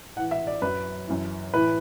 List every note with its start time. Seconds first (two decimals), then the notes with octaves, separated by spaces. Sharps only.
0.16 A2 E3 F#5
0.31 E5
0.47 D5
0.62 F#2 F#3 B4
1.07 F#2 E3
1.53 A2 E3 B4